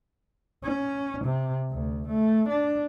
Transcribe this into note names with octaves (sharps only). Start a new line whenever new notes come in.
C#4
C3
D2
A3
D4